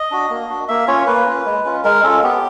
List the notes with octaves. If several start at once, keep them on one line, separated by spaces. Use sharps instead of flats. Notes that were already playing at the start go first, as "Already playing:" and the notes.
Already playing: D#5
D4 F#4
A#3
D4 F#4
A#3 E5
C#4 F4 C#5
A#3 B4
C#4 F4
G#3
C#4 F4
G#3 A#4
C#4 F4 A4
B3 G4